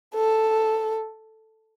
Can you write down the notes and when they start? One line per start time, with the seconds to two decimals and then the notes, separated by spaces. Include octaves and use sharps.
0.15 A4